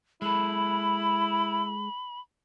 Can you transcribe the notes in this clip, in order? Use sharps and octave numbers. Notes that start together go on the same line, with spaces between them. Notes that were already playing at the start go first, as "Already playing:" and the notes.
G#3 E4 A4 B5